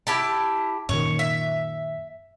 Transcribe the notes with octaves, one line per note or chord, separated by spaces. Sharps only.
E4 G4 A5
F#2 A#2 D#3 C#5
E5